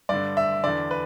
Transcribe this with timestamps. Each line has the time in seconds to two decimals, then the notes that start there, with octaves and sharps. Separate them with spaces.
0.09 G2 D3 D5
0.37 E5
0.64 E2 D3 D5
0.91 B4